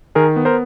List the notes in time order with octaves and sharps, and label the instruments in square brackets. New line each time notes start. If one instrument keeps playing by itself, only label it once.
[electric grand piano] D#3 G#4 A#4
B3
A#4 C5